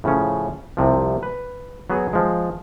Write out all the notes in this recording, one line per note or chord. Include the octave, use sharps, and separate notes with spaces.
A2 C#3 F3 C#4
C2 C3 F3
B4
F#3 B3 F#4 G#4
F3 G#3